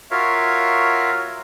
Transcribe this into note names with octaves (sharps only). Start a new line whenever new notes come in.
F4 F#4 A#4 C#5 E5 F5